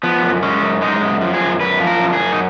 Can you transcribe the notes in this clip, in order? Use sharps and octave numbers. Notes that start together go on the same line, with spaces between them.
F3 B3
F#2
G#3 C#4
F#2
G#3 D#4
F#2
F3
G#4
F#2
F#2 B4
F3
A#4
F#2
G#4
F#2
D#4